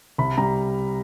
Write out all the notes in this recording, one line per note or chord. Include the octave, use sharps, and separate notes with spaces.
C2 B5
G3 A#5